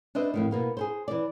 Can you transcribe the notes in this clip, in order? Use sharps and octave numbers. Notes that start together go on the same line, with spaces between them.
D4 B4 C5 D#5 E5
F2 A2 D#3
B2 A#3 B3
G#4 A4 C5
E3 D5